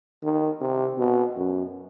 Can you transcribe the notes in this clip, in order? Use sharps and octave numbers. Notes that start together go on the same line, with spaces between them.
D#3
C3
B2
F#2